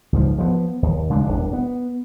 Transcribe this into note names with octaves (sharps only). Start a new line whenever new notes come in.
C#2 G#2 F3
F3 F#3 B3
D#2
C#3 G#3 C#4 D4
D#1 G#1 E2 D4
B3